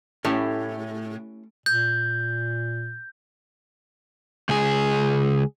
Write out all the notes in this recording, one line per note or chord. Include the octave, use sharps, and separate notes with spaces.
A2 A3 C#4 E4 G4
A#2 G6
C#2 G#4